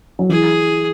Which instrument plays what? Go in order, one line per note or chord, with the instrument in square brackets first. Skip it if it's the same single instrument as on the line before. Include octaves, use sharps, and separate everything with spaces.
[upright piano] F#3
[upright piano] E3 [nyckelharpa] G#4